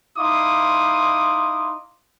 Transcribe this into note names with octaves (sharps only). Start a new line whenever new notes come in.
D#4 E4 F5 C6 D6 D#6